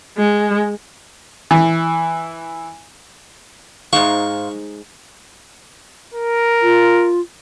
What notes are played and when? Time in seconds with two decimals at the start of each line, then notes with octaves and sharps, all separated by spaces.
0.17 G#3
1.51 E3
3.93 G#2 G#3 D#4 C5 F5 C#6
6.14 A#4
6.62 F4